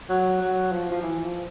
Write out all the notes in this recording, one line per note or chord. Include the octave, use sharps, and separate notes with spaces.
F#3
F#3
F3
F3
E3
F3